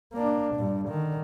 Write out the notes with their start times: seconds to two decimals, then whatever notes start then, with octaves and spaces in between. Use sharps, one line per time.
0.14 A#3 D4
0.56 G2 A#2
0.85 D3 D#3